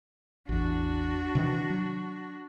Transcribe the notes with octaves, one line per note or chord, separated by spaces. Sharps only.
A1 E2 D4 F#4
C3 D#3 E3
F#3